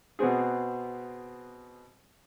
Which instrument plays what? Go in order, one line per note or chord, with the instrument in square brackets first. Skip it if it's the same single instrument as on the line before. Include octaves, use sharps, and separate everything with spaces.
[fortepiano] B2 B3 C4 G#4